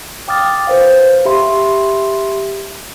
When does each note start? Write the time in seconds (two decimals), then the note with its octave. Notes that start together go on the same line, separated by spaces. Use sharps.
0.28 F5 G5 D6 D#6 F6 A6
0.67 B4 C5 F5
1.25 G4 E5 B5 C6